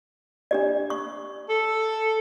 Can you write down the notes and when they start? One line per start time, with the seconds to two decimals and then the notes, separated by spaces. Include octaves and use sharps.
0.51 D4 G4 D5
0.90 C#6
1.49 A4